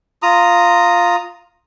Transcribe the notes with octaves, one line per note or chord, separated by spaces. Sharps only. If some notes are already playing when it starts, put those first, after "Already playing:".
F4 A#5 D#6